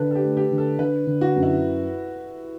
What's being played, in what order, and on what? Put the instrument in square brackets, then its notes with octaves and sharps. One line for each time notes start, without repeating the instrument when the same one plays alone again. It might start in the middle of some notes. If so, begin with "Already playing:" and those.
Already playing: [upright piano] D3 [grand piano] A4 B4 D5
[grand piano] A4
G4
[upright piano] A3
[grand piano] G4
[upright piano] D3
[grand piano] A4
[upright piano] D3 [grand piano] B4
[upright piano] D3
[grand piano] F#4
[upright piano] F#2
[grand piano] E4